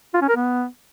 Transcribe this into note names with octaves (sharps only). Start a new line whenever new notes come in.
F4
C#4
A#4
B3